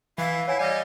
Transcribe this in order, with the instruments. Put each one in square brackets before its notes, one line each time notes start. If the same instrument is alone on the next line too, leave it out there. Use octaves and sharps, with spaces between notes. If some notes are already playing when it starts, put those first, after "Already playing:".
[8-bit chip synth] E3 [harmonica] E4 [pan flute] F5
[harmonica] E4 [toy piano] C#5 F#5 G#5
[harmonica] G3 [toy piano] D5 [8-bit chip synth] D#5 G#5